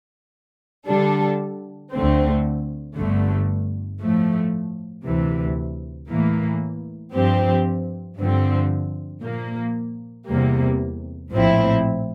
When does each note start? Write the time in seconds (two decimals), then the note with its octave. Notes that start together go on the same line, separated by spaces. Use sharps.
0.88 D3 G3 D4 A4
1.92 D2 D3 A3 C4
2.97 G1 G2 D3 A3
4.01 A2 F3 A3
5.05 D2 C3 E3
6.09 A2 E3 A#3
7.14 G2 F3 C4 G4
8.18 G2 D3 F3 C4
9.22 A#2 F3 A#3
10.26 E2 C3 G3 A#3
11.31 A#1 A2 F3 C4 E4